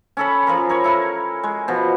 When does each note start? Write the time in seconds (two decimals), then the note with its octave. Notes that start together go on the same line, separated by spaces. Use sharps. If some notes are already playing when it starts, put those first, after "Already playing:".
0.17 C#4 A4 B5
0.47 F3 F4 G#4 A#4
0.69 A#4 C#5 B5
0.84 E4 A4 A#4
1.43 G#3
1.68 B2 F3